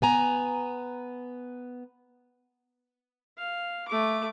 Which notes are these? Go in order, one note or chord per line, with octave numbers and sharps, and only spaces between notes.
B3 G#5 A#5
F5
A3 D6